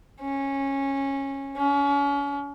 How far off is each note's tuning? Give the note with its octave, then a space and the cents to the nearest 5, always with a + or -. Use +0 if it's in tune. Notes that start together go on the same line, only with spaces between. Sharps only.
C#4 -15
C#4 +35